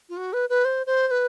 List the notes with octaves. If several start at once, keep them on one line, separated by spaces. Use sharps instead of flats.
F4
F#4
B4
B4
C5
C5
C5
B4